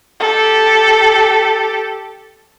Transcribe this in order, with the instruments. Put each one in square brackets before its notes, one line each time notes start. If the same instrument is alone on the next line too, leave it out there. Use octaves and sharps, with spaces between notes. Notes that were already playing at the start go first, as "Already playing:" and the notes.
[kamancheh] G4 A4